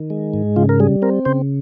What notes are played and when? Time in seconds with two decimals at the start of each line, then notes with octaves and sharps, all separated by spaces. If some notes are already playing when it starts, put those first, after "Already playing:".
Already playing: D#3
0.10 G#3
0.34 G#2
0.56 C#3 F4
0.69 A#4
0.80 G3 G#4
1.02 C4 A#4
1.25 C#3 C5